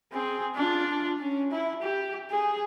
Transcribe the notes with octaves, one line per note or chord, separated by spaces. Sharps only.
C4 G#4
D4 F4
C#4
E4
G4
G#4